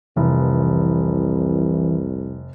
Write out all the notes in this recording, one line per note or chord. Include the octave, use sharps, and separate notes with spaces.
F1 C2 E3